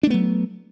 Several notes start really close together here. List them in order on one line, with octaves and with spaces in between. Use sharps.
D4 A3 B3 F#3